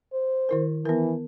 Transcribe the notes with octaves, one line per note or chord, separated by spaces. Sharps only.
C5
D#3 E4 A#4
E3 B3 A#4